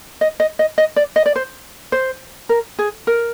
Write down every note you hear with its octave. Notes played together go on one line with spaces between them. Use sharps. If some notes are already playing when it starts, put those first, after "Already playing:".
D#5
D#5
D#5
D#5
D5
D#5
D5
C5
C5
A#4
G#4
A#4